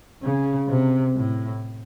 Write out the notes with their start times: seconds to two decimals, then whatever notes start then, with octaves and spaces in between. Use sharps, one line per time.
0.23 C#3
0.68 C3
1.15 A2